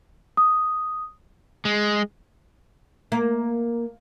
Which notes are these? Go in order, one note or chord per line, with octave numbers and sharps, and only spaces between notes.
D#6
G#3
A#3